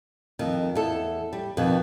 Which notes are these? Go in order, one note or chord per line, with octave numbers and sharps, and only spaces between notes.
F2 D#3
E2 A4
G3
F2 B2 D#3